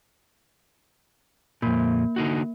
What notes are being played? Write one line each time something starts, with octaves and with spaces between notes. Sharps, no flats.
F2 A#2 A#3
D3 D#4 F#4